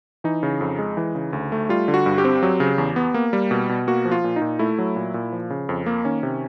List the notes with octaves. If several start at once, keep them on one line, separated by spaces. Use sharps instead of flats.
E3 D#4
C#3
F2
G#3
E3
C#3
D2
A3
G3 F4
D3
F#4
G2
G4
C4
F#3
C#3
E2
B3
A#3
G3
B2
B2
A#3 F#4
F3
F4
A#2
D#4
A#2
A3 E4
F#3
A#2
A#2
F3
C#3
F2
A#3
D#3 C#4
C3